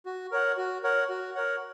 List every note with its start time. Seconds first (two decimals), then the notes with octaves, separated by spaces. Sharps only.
0.06 F#4
0.32 A#4 C#5 F#5
0.57 F#4
0.83 A#4 C#5 F#5
1.09 F#4
1.35 A#4 C#5 F#5